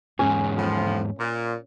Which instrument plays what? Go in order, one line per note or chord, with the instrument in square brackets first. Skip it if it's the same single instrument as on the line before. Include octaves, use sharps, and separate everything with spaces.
[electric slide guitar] E2 G#2 [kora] C#4
[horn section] A2 F3
A#2